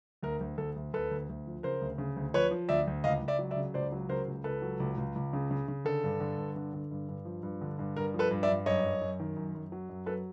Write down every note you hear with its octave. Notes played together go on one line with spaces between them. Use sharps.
D2 A#4
D2
D2 A4
D2
D2 A4 B4
D2
D2
F3
C#3 A#4 C5
D2
C#3
D2
F3 B4 C#5
F3
D2 D5 E5
D2
C#2 D#5 F5
C#2
D5 E5
F#3
D5 E5
C#3
C#2 C5 D5
F#3
C#3 A#4 C5
C#2
C#2 A4 B4
F#3
C#2
C#2
C#2
C#3
C#3
C#3
D3 A4
G2
D3
G2
D3
D3
G2
G2
F3
G2
D3
G2
G2 A#4
F3
A4 B4
G2
D5 E5
G2
F#2 C#5 D#5
F#2
F#2
D#3
F#2
F#2
F#3
F#2
F#3 A4 B4